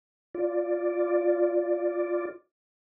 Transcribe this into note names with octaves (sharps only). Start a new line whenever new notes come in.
F4 D5